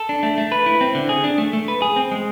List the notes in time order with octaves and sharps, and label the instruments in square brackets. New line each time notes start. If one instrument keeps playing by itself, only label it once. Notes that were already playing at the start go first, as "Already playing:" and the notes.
Already playing: [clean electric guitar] A4
D4
A3
A3
B4
E4
C4
D3
G#4
D4
A3
A3
B4
G#4
C4
G#3